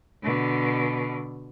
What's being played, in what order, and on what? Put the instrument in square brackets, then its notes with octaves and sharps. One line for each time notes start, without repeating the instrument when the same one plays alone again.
[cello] B2 D3